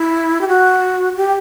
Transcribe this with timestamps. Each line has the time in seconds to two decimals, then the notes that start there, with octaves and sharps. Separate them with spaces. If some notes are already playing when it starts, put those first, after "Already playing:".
Already playing: E4
0.41 G4
0.48 F#4
1.17 G4